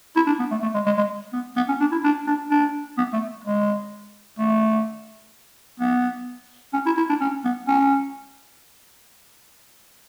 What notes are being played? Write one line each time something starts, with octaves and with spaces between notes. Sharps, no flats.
E4
D4
B3
A3
A3
G#3
G#3
G#3
B3
B3
C#4
D4
E4
D4
D4
D4
B3
A3
G#3
A3
B3
C#4
E4
E4
D4
C#4
B3
C#4